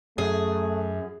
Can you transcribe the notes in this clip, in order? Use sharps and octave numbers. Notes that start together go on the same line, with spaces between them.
F#2 A3 G#4